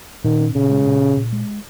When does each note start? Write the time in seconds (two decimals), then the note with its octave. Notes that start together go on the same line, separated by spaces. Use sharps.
0.24 A#2 D#3
0.40 C#4
0.55 A#2 C#3
0.70 G#3
0.86 A#2
1.01 C#4
1.17 A#2
1.33 G#3